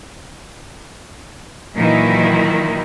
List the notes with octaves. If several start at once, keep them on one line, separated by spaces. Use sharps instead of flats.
A#2 D#3 E3 F#3 D#4 E4